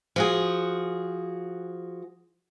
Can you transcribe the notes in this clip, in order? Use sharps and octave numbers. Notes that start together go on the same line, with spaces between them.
F3 F#4 G#4